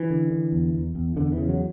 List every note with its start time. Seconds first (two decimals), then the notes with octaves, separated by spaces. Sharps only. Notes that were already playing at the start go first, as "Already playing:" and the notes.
Already playing: E3
0.10 D3
0.31 D3
0.52 E2
0.74 E2
0.95 E2
1.16 E2 D3
1.32 E3
1.38 C#3
1.49 F#3